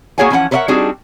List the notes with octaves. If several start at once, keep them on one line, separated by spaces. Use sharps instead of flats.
A#3 F#4 G#4 C#5 F#5 G#5
E3 F3 C#4 C5 F#5
A#4 B4 C#5 D#5 E5 F#5
G3 C4 D4 D#4 F#4 G#4